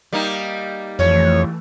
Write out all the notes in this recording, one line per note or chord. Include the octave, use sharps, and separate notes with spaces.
G3 A#3 D#4
F2 E3 A3 C#5